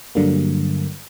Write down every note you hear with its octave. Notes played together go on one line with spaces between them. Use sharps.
G2 D3 F#3 G3 A#3